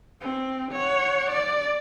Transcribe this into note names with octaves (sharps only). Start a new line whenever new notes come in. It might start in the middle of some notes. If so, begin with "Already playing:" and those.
C4
C#5 F#5
D5